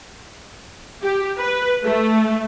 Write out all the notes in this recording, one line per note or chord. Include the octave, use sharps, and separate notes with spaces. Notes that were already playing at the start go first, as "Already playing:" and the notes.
G4
B4
A3